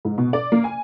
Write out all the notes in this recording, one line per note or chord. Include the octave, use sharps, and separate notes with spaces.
G#2
B2
D5
A#3
G#5